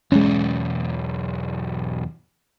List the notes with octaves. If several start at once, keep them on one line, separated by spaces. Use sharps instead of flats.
B1 E2 G#3 C#4